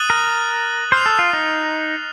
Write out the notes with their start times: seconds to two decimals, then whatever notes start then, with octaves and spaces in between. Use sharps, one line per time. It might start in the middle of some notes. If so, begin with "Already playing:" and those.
Already playing: D#6 F#6 A6 D#7 F#7
0.10 A#4
0.92 C5 F6 C7 F7
1.06 A4
1.19 F4
1.33 D#4